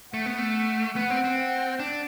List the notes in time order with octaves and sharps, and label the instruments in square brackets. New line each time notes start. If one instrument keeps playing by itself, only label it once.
[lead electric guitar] A3 [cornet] F#5
[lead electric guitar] B3
A3
[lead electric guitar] B3 [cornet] F#5
[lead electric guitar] C4
C4
[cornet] F#5
[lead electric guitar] D4